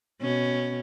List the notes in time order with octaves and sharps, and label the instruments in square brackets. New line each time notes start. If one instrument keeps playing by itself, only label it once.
[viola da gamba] B2 C#4